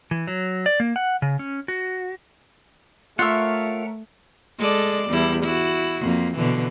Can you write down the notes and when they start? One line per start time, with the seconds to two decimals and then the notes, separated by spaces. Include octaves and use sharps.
0.11 E3
0.27 F#3
0.66 D5
0.80 A#3
0.96 F#5
1.22 C#3
1.39 C#4
1.68 F#4
3.19 A3 F4 A#4 C#5 E5 F#5
4.58 G#3 A4 D5
5.08 E2 G3 E4
5.44 E4 F#4
6.01 F2 A#3
6.36 B2 D3 E3